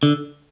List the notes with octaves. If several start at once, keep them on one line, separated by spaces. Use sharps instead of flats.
D3